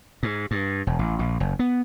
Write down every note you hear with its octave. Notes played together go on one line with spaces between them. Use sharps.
G#2
G2
E1
A1
A#1
F#1
B3